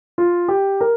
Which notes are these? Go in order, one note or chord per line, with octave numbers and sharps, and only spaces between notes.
F4
G4
A#4